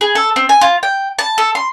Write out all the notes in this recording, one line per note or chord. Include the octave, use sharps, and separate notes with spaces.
G#4
A4
C4
G#5
F4
G5
A5
A4
C6